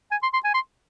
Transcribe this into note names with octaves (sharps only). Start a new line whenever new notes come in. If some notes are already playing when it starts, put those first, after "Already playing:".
G#5
C6
C6
G#5
C6